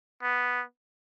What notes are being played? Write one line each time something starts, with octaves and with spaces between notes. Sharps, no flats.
B3